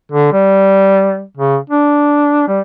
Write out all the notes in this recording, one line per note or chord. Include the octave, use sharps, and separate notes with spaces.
D3
G3
C#3
D4
G3